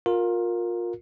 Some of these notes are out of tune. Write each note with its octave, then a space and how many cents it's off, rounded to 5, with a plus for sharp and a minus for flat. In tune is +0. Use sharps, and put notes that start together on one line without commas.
F4 +25 A#4 +0